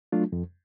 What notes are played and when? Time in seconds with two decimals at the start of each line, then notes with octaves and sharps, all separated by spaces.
0.12 F#3 A3 D4 F4
0.32 F2